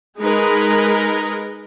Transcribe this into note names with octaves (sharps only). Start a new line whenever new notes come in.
G#3 D#4 A#4 B4